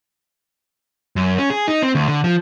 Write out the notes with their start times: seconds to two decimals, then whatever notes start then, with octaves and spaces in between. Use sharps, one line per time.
1.16 F#2
1.38 C#4
1.50 G#4
1.68 D#4
1.83 C4
1.95 D2
2.08 D3
2.24 F3